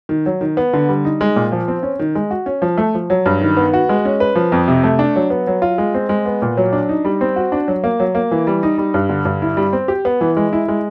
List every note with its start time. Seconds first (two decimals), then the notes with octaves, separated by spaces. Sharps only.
0.09 D#3
0.26 F#3
0.41 D#3
0.57 B3
0.73 D3
0.89 G3
1.05 D#4
1.21 G#3
1.36 A#2
1.52 F3
1.68 C4
1.83 C#4
1.99 D#3
2.15 G#3
2.31 F#4
2.46 C#4
2.62 F3
2.78 A3
2.95 F3
3.10 F#3
3.26 G2
3.41 D#3
3.57 B3
3.74 F#4
3.89 G#3
4.05 C#4
4.20 B4
4.35 F3
4.52 F2
4.68 C3
4.84 A3
4.99 D4
5.16 F#3
5.30 B3
5.47 F#3
5.62 F4
5.78 G#3
5.94 C4
6.09 G#3
6.26 B3
6.42 A#2
6.57 F#3
6.73 D4
6.89 D#4
7.05 G3
7.21 C4
7.36 F#4
7.52 D4
7.68 F#3
7.84 A#3
8.00 F#3
8.15 A#3
8.31 E3
8.47 G3
8.63 D#4
8.78 G3
8.94 G2
9.09 D3
9.25 G2
9.42 E4
9.57 G3
9.73 C4
9.88 G4
10.05 B3
10.21 E3
10.37 G#3
10.53 E4
10.68 G#3